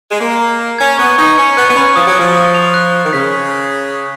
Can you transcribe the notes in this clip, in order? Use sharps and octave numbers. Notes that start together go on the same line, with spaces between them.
G#3
A#3 A#5
A#5
A#5
C#4 G#6
B3 C#6
D#4 C#6
C#4 C#7
B3 F#6
B3
C#4 B5
F3 D#6
F#3
F3 D#6
D#6
F7
F#6
F#6
D#3
C#3 B6
B6
B6
B6
F#6